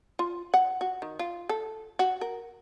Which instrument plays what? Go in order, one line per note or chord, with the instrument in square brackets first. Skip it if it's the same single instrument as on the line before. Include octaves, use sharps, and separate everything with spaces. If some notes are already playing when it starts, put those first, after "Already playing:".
[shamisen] F4
F#5
F#4
D#3
F4
A4
F#4
A#4